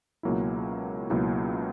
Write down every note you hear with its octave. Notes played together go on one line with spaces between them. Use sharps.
C#2 B2 F#3 A#3 E4
C#2 B2 F#3 A#3 E4